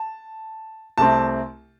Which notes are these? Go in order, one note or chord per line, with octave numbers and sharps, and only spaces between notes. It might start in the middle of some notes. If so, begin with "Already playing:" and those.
Already playing: A5
C2 C3 A3 C4 A5